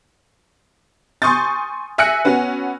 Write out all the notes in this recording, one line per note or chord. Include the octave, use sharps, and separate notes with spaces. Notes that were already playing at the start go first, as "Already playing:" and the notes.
G#5 C6 C#6 D#6 G6 A6
E5 G#5 E6 F#6 A#6 C#7
B3 C#4 F#4 F#5